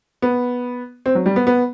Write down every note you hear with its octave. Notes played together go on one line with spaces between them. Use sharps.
B3
C4
F#3
G3
B3
B3